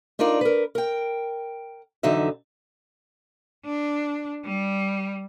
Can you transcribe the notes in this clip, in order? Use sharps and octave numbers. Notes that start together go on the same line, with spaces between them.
D4 D#4 F4 A#4 D5
A#4 B4
A#4 G5
F2 D3 E3 F#3 D#4 E5
D4
G3